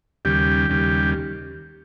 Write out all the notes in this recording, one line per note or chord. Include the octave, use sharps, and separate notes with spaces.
D#2 C#3 G3 G4
D#2 C#3 G3